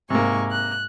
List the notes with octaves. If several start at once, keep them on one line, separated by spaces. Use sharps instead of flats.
G#2 C3 A#3 G#5 C#6
F#6